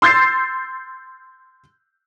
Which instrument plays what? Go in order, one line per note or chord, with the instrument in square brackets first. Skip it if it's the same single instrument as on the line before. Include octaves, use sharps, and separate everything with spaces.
[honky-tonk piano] C6 E6 G6 A6 C7